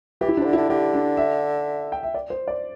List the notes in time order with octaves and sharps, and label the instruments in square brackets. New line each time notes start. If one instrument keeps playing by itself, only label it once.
[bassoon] E3 [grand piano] G4
[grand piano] E4
D4
[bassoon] C3
D3
[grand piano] E4
[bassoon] D3
[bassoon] D3 [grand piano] G4
[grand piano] D4
E5
G5
E5
D5
C5
D5